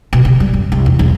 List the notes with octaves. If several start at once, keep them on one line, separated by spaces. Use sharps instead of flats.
B2
D3
G3
F#2
C2
E2
B1